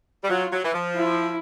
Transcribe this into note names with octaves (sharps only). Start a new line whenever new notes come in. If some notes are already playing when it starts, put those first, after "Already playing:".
G3
F#3 F4
F#3
E3
F3
E4